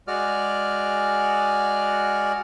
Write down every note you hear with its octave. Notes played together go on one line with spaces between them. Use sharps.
G#3 F#4 D5 F6